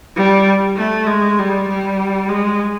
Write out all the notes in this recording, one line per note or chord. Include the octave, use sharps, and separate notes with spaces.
G3
A3
G#3
G3
G3
G#3